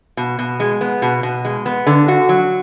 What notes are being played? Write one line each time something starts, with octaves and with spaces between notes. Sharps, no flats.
B2
B2
G#3
B3
B2
B2
G#3
B3
D3
F#4
F#3